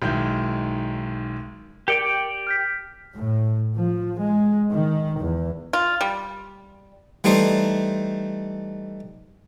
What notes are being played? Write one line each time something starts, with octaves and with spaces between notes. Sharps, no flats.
B1 D#3 G#3 E4 G6
G4 A#4 D5 G5 C#7 G7
F6 G6 B6
A2
F3
G#3
D#3
E2
F4
G3
E3 G3 A3 D#4 C5